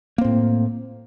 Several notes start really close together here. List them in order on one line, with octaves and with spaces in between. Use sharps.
A#3 C4 A2